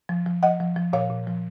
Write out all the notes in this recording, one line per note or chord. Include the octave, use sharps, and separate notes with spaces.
F3
F3
F3 D#5 F#5
F3
F3
A#2 C#5 F5
A#2
F3